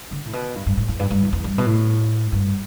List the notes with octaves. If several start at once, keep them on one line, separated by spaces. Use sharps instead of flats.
D3
A2
B2
G2
G2
A2
E2
G2
G2
E2
E2
G2
B2
A2
G2